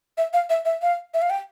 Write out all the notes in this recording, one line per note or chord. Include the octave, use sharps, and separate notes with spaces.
E5
F5
E5
E5
F5
E5
F5
G5